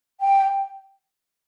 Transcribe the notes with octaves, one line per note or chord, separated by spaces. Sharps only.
G5